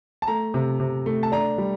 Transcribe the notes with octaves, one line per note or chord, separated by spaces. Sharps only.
A5
A3 A#5
C3
C3
A3
A5
D4 A#5
G3